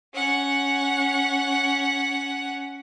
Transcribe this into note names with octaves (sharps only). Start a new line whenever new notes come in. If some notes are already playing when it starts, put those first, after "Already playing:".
C#4 F#5